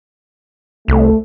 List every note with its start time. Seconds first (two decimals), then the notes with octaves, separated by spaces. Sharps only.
0.88 C2 A3